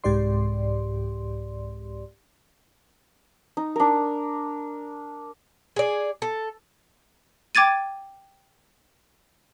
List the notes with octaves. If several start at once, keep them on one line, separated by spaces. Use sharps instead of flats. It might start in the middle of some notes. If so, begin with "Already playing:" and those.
C2 G#2 G4 D5 C6
D#4
D4 A#4
G#4 D5
A4
G5 D6 G#6 A6 D#7